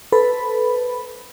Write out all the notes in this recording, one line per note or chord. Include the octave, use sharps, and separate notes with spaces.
A4 B4 C5 B5